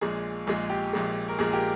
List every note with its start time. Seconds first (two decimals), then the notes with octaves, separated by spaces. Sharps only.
0.01 A#1 A#2 G#3 G#4
0.47 A#1 A#2 G#3 G#4
0.70 G4
0.93 A#1 A#2 G#3
1.29 A#4
1.39 A#1 A#2 G#3 G#4
1.53 G4 A#4